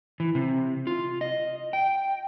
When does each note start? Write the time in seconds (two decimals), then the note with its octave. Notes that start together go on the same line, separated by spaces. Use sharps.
0.20 E3
0.35 C3
0.87 F4
1.21 D#5
1.73 G5